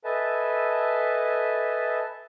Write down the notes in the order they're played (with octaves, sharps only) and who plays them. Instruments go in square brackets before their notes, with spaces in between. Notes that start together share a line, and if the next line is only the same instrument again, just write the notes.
[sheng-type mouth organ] A4 B4 D#5 E5 G#5 A5